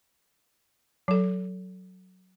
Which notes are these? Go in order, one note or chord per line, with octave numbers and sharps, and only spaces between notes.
F#3 A4